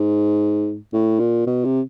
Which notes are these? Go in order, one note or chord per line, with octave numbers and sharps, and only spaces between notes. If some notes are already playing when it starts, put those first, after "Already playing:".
Already playing: G#2
A2
A#2
B2
C3